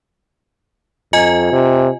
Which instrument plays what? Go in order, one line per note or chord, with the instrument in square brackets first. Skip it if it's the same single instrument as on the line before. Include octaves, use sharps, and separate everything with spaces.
[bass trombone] F2 [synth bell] F4 D#5 G#5
[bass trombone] C3